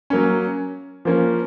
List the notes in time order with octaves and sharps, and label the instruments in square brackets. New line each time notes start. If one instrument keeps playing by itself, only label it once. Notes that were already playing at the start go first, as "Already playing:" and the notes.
[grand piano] F#3 A#3 C#4
F3 A#3 C#4